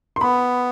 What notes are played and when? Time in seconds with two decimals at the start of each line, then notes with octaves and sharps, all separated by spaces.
0.16 C6
0.21 B3 B5